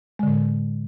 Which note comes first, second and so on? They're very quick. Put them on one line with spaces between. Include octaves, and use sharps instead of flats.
G#3 D3 A2